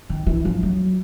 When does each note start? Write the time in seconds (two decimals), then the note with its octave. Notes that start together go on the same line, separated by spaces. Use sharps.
0.10 D#3
0.27 E3
0.45 F3
0.63 F#3